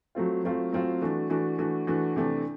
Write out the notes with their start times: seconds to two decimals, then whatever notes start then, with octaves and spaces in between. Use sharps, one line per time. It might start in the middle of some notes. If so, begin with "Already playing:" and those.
0.15 F#3 A3 C4 F4
0.44 F#3 A3 C4 F4
0.72 F#3 A3 C4 F4
1.02 E3 A3 D4 F#4
1.30 E3 A3 D4 F#4
1.58 E3 A3 D4 F#4
1.87 E3 A3 D4 F#4
2.16 C3 E3 A3 D4